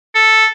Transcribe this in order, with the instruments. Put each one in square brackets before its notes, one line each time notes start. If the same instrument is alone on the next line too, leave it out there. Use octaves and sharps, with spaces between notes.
[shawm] A4